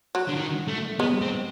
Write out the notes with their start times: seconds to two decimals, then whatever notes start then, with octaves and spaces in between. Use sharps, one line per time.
0.15 F#3
0.28 D3
0.36 D#3
0.68 A3
0.99 G#3 B3
1.22 C4